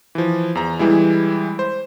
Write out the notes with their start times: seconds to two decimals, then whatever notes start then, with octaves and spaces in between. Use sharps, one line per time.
0.15 E3 F3
0.55 E2 A#5
0.79 E3 G3 G#3 E4
1.59 C5